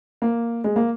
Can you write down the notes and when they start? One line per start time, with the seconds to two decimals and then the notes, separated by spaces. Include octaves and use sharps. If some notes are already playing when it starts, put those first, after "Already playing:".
0.22 A#3
0.64 G#3
0.76 A#3